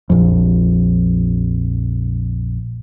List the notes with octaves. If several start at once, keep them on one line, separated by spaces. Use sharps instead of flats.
A#1 F2